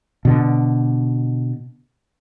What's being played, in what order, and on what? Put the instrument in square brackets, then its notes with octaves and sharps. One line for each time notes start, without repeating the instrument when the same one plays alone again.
[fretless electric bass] B2 D3